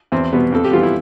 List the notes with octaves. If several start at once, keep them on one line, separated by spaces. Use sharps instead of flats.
E2 C4
B2 G3 B3
F2 A4
G4
E3 G3 B3 F4
E4